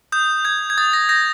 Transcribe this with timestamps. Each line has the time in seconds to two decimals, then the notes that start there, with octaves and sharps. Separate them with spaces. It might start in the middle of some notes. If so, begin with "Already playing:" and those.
0.12 D#6 G6
0.45 G6 G#6
0.70 G#6
0.78 D#6 A6
0.93 A#6
1.09 G6 A#6